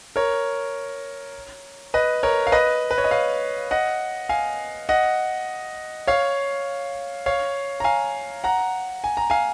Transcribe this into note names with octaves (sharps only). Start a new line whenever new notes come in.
A#4 C#5
B4 D#5
A#4 C#5
F5
B4 D#5
B4
C#5
D#5
C#5 F5
D#5 F#5
F5 G#5
D#5 F#5
C#5 F5
C#5 F5
A#5
F5 G#5
F#5 A#5
G#5
A#5
F5 G#5